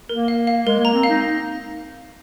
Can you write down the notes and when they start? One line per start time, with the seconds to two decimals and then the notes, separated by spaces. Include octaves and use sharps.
0.09 A#3 A#4
0.28 F5
0.47 F5
0.66 G#3 A#4
0.80 A#3
0.85 A#5
0.94 C4
1.03 F5
1.09 D#4